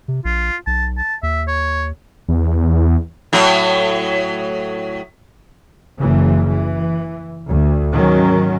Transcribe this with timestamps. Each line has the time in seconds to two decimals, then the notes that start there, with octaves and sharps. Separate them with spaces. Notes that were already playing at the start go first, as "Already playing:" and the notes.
0.08 C3
0.25 A#1 F4
0.67 B1 A5
0.98 A5
1.23 D#2 E5
1.48 C#5
2.28 E2
3.33 A2 F#3
5.98 F#1 C#3 E3
6.48 E3
7.47 D2
7.92 G#2 D#3 F#3 C#4